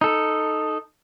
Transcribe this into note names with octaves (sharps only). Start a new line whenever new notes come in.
D#4 A4